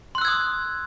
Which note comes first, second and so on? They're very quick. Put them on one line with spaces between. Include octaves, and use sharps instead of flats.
C6 F#6 E6 G#6 D#6